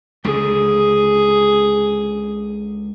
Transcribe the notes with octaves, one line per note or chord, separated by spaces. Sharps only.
C#2 D3 G#4